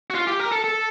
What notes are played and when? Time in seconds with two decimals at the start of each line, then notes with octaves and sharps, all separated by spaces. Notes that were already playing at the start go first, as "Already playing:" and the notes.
0.10 F#4
0.15 F4
0.27 G4
0.39 A#4
0.52 A4
0.64 A4